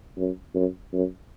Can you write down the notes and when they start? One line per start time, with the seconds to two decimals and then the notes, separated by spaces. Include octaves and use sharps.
0.17 F#2
0.55 F#2
0.93 F#2